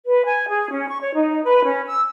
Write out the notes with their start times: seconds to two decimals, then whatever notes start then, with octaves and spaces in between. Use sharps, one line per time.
0.06 B4
0.26 G#5
0.49 G#4
0.71 C#4
0.88 C#6
1.01 C#5
1.15 D#4
1.43 B4
1.65 C#4
1.86 E6